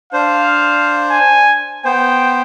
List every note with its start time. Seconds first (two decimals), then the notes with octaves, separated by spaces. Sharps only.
0.13 D4 C5 F5
1.11 G#5
1.85 B3 C5 G5